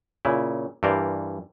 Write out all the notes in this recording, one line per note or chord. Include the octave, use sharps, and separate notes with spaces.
A#2 C#3 E4
G2 E3 A#4 C5 D5